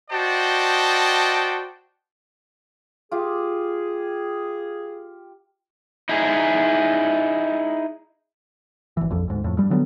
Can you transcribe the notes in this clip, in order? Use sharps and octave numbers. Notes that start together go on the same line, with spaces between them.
F#4 C5 D5 D#5 G5 A5
F4 G4 G#4
D#4 E4 G#4
G#1 E3
A#1 F2
D2 G#2
F2 A2
G2 G3
D3 F#3 G3 B3